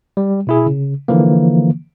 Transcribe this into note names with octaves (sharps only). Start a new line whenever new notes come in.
G3
B2 E4 G#4
C#3
D3 E3 F3 A#3